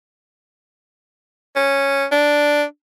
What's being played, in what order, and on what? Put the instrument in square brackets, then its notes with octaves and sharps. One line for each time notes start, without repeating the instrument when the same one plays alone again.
[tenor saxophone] C#4
D4